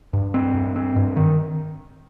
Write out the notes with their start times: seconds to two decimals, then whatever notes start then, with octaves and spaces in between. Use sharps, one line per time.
0.13 G2
0.34 C4
0.55 G2
0.76 C4
0.96 G2
1.16 D#3